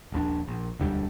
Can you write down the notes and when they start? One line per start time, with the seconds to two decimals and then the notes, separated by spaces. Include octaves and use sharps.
0.12 D#1 A#1 D4
0.48 A#1
0.79 E1 D2 D3 G3